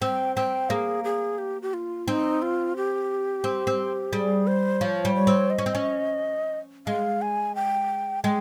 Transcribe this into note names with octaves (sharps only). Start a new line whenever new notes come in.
C4 G5
C4 G5
A#3 G#4
G#4
G4
G4
F4
C4 D#4
F4
G4
C4
C4
G3 G#4
C5
F3 C#5
G3
C#5
C4
D#5
C#4
C4
C#4
G#3 F5
G#5
G5
G#3 G5